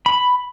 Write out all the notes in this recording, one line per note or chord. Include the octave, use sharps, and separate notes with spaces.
B5